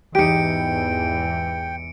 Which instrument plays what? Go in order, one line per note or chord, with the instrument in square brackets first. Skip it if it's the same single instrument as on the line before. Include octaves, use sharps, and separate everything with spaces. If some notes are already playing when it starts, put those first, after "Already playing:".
[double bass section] E2 G#2 E3 [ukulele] D#4 G4 [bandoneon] G5 [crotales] C#7 D7